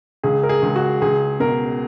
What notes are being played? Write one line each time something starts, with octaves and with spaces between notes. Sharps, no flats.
C#2 G#4
A#4
G#4
C#2
F#4
C#2 G#4
B2 A#4